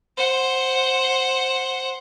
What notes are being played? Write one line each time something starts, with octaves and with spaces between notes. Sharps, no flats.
C5 F#5